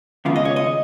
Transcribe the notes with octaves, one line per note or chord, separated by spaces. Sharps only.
D#2 C#3 G#3 B3 F4 F5
D#5
C#5
D#5